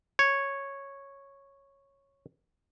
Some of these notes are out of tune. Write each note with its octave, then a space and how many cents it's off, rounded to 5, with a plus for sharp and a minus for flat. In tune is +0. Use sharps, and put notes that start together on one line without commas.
C#5 -5